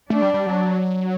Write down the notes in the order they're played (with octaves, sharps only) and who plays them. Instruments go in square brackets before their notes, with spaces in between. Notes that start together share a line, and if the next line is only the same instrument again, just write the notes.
[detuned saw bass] A3 [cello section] D4
[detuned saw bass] G3
G3
F#3